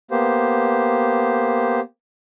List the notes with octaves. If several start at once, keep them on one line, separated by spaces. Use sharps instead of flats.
A#3 B3 G4 C5